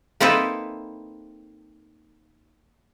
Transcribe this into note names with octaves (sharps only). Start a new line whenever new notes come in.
A#3 C4 D#4 E4 A4 B4